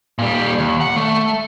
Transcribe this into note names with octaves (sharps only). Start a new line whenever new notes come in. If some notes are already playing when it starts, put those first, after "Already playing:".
A#2 G3
D#2
F#5
A3